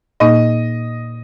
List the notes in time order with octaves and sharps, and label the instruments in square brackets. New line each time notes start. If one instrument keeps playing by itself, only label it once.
[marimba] A#2 A#3 D#4 [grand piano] D#5